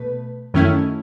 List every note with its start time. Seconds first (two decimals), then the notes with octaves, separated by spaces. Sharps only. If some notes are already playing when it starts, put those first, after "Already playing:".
Already playing: B2 A3 B4
0.54 F#2 D#3 A3 C#4 E4